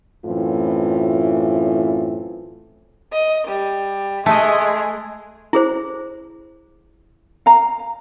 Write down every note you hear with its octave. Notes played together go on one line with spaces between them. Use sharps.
F#2 A2 E3 C4 F4
D#5
G3
G#3 A3 G#4 D#5
E4 G#4 C5
F5 A#5